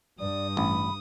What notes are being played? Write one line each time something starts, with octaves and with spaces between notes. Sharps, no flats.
G2 D5 D#6
A1 B5